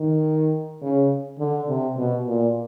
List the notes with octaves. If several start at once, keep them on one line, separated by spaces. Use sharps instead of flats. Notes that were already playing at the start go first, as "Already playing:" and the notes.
Already playing: D#3
C#3
D3
C3
B2
A#2